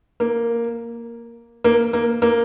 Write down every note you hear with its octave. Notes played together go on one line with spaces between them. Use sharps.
A#3
A#3
A#3
A#3